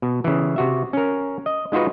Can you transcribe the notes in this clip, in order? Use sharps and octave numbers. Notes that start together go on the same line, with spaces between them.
B2
C#3 E3
C3 F#4 E5
C#4 A#4
D#5
G#3 D#4 F4 F#4 B4